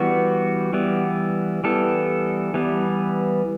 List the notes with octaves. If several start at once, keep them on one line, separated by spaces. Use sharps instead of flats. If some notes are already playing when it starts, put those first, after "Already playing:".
Already playing: E3 G3 B3 F#4
E3 G3 B3
E3 G3 B3 A4
E3 G3 B3